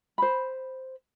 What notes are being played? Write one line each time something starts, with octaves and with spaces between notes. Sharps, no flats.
C5 B5